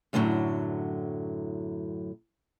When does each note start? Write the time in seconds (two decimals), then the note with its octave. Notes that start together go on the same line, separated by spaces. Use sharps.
0.13 F#2 A2 D3 D#3 F#3